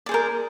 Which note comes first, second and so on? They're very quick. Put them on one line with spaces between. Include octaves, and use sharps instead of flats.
D5 G#4 C5 A#4